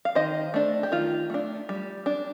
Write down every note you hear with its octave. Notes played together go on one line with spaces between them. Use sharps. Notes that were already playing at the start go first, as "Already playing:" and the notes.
F5
D#3 C5 D#5
A3 D4
G4
D#3 F4
A3 D4
G3
D4